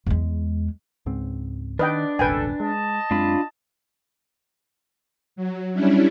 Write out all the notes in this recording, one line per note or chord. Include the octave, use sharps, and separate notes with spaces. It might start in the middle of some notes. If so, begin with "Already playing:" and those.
E2 G#3
C#2 G#2 C4
D#3 D4 B4 D5 D#5 G5
D#1 G#1 C#2 A4 B4 G5 G#5
G#3 D#5 A5
F#2 G#3 C4 D4 F4 B5
F#3
G3 C#4 D4 E4